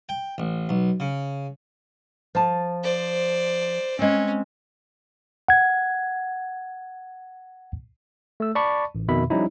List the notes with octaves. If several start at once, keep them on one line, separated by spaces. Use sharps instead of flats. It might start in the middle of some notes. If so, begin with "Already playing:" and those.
G5
A1
B1
C#3
F3 A5
C5 D5
G#3 C4 C#4
F#5 G#6
A3 E6
D5 A5 B5 C#6
A1
F2 B2 D#3 E5 B5
F3 G3 C#4 D#4 E4